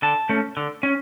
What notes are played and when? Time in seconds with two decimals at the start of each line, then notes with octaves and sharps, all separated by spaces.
0.02 D3 A5
0.29 A3 C#4
0.57 D3
0.83 C#4